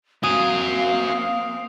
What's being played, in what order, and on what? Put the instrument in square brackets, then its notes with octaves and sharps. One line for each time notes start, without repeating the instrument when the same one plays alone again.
[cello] A#3 C4 [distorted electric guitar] F#4 G#5 [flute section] F5 [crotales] D#6